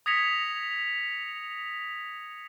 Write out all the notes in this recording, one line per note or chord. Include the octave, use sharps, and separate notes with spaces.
D#6 G#6 A#6 B6 C#7 F7